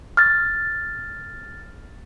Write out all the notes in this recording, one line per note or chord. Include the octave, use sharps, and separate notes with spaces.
F6 A6